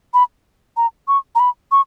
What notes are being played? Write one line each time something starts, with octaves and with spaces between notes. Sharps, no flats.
B5
A#5
C#6
A#5
B5
C#6